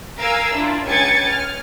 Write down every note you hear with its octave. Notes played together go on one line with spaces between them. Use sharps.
A#4 F5 G#5 A#5 E6
D4 E4 F4
C#2 G5 G#5 G#6 A6 C#7
F6